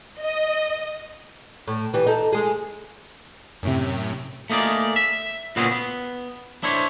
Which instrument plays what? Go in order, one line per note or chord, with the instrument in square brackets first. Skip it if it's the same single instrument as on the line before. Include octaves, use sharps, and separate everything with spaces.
[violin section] D#5
[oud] A2
E3 G3
D#4 A4
G#3 G#4
[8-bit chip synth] F#2 A2 C3
[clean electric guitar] A3 A#3 D#4 G#4 D5
E5
A#2 C#3 B3 C4 F#4 G#4
B3
D4 E4 C5 C#5